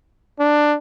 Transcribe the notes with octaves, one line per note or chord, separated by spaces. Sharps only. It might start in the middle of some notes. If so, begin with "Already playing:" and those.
D4